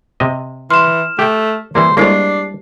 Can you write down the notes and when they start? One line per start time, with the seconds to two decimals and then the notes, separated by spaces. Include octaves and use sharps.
0.20 C3 D#5
0.70 E3 C6 F6 E7
1.19 A3 G4 G5
1.75 E3 G3 A#3 C5
1.97 G3 G#3 A#3 D4 E4 G4 C5 C7